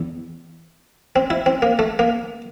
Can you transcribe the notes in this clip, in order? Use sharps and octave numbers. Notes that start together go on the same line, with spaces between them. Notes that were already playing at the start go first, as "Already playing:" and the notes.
Already playing: E2
C4
E4
C4
A#3
A3
A#3